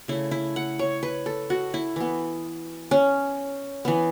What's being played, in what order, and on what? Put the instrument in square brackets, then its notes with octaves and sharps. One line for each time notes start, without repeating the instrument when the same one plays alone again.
[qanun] C#3 A3 E4
E4
F#5
C#5
B4
A4
F#4
E4
E3 B3
C#4
E3 B3